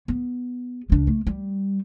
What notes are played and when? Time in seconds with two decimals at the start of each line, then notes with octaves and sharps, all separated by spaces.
0.08 B3
0.90 C#2 D4
1.07 A3
1.27 G3